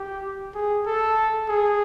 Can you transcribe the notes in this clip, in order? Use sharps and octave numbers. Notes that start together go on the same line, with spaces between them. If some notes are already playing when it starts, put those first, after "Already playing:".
Already playing: G4
G#4
A4
G#4